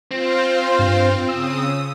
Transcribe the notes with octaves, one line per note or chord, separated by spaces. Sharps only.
C4 F4 C5 F5
G2
C#3 D#6 E6